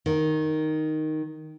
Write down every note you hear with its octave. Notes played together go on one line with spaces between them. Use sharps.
D#3